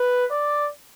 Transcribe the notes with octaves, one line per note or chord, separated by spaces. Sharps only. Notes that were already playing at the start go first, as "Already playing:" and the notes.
Already playing: B4
D5